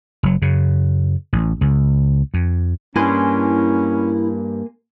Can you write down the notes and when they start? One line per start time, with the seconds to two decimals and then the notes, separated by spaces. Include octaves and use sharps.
0.23 F#1 F#3
0.42 F#2 C#3
1.33 A1
1.61 C#2
2.34 F2
2.96 G2 A#3 C#4 E4 G#5 C6